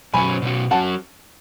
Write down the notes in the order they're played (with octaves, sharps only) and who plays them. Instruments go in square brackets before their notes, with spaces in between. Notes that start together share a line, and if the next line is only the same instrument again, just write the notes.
[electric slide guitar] B2 F#3 C#4 F#4 [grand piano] G#5 B5
[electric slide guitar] B2 F#3 C#4 F#4
[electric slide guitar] F#3 C#4 F#4 [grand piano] F#5 A5